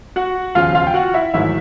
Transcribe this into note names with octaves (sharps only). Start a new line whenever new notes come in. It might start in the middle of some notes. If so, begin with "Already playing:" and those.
F#4 F#5
E1 D#2 C#3 F3 F4 F5
F4 F5
G5
F#4 F#5
E4 E5
A1 G#2 D#3 F#3 E4 E5